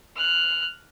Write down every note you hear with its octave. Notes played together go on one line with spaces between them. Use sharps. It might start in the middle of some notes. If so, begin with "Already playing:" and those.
F6 F#6